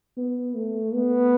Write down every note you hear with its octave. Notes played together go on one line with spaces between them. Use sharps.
B3
A3
B3